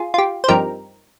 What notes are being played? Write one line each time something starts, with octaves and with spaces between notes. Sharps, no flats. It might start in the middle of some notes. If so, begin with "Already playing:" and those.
Already playing: F4 G#4
F4
G4
C5
G2 F3 C4 D#4 G4 A#4